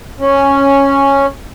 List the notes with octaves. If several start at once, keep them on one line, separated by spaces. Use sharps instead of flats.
C#4